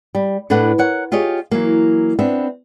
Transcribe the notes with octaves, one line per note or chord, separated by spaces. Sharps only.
G3
A2 D4 A4 B4 F#5
A#4 C#5 F#5
F4 G4 G#4 C#5 D#5
E3 F#3 A#3
B3 C4 D4 E5